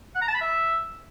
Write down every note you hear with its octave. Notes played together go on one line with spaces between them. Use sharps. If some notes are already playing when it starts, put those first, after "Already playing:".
F#5
A#5
A5
B5
E5